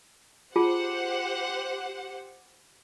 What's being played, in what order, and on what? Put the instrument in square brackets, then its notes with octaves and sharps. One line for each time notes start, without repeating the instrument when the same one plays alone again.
[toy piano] F4 G#4 A5 [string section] G4 C5 F#5